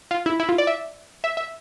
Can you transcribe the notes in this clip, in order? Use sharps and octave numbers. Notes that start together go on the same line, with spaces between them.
F4
E4
E4
F4
D5
E5
E5
E5